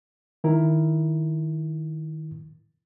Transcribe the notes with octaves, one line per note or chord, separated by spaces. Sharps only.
D#3 E4 A#4